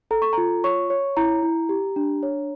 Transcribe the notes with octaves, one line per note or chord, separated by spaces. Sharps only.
A4 A#5
C#6
F4 A#5
C#5 C#6
C#5
E4 A#5
E4
G4
D4
C#5